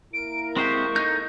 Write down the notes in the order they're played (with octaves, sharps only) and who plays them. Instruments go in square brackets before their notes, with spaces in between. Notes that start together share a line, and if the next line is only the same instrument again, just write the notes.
[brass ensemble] A#3 E4 A#4 [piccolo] D7
[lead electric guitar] G#3 C5 [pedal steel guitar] C4 G4 [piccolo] C#6
[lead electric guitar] D#4 [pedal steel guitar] A4 G6